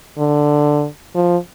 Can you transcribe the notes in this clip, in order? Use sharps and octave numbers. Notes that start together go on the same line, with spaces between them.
D3
F3